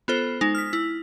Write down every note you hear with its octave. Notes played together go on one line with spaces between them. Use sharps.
B3 F4 A4 C5
G#3 D#4
F6 B6
E4